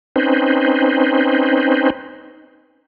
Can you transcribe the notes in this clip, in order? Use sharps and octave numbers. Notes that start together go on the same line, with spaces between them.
C4 C#4 D#4 B4 C5